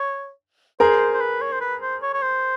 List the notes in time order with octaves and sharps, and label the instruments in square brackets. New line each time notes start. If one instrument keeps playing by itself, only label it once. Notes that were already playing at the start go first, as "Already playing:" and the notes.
Already playing: [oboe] C#5
[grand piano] G#4 A#4 [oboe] C5
[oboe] C5
B4
C#5
C5
B4
C5
C#5
C#5
C5